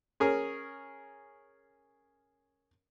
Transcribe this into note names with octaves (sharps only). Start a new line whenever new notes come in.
C#4 G#4 A#4